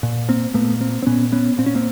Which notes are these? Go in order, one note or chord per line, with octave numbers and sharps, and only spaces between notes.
A#2
A#3 C4
A#2 A3 B3
A#3 C4
C4
A#2 B3 C#4
B3 C#4
A#2 C4
C#4
A#3 C4